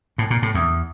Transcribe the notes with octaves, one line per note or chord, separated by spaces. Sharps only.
A2
A#2
A2
E2